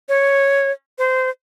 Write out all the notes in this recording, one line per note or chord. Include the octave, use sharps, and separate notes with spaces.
C#5
C5